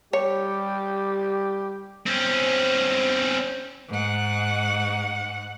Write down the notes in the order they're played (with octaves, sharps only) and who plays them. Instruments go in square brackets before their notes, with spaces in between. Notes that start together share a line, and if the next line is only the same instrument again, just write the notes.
[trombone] G3 [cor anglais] G4 [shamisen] C#5
[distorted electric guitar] C4 C#4
[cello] G#2 F#5